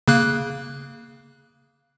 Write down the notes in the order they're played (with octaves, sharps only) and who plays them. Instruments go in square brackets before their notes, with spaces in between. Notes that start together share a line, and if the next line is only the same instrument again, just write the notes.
[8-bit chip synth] C#3 A#3 F#6